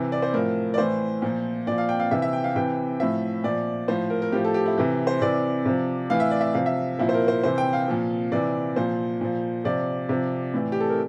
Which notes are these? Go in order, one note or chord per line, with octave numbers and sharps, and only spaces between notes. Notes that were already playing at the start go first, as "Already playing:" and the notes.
Already playing: C3 E3
D5
C5
A2 F3 A#4
D5
A2 E3 C5
A#2 F3
A#2 F3 D5
F5
G5
F5
C3 E3 E5
E5
G5
F5
C3 E3 G5
A2 F3 E5
A#2 F3 D5
A2 F3 C5
A#4
A#4
A2 F3 G4
A4
G4
E4
C3 E3
C5
C3 E3 D5
C3 F3
A2 E3 F5
E5
D5
E5
C3 F3 F5
E5
A#2 F3 E4
C5
A#4
C5
C3 E3 C5
G5
F5
A#2 F3
C3 E3 D5
A#2 F3 C5
A#2 F3
C3 F3 D5
C3 F3
A2 E3
G4
A4
A#4